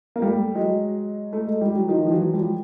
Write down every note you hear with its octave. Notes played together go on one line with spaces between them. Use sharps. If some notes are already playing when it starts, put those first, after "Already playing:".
A#3
G3 A3
F#3 G#3
A3
G#3
G3
F#3
D#3 F3
F3
E3 F#3
F3 G3